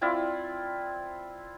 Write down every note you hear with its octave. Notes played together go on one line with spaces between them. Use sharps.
C4 E4 F4 D5